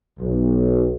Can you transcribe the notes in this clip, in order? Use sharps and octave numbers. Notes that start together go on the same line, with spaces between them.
B1